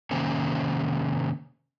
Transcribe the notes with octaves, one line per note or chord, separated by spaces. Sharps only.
C3 D#3 A#3 C#4 C5